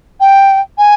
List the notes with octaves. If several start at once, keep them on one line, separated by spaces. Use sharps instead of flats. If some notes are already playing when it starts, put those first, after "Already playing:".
G5
G#5